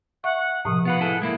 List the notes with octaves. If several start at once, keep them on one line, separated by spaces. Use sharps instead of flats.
E5 F#5 C#6
B1 A2 C3 F3 D#6
B3 F4 B4 F#5
E4 G#4 A4
G#3 A#3 E4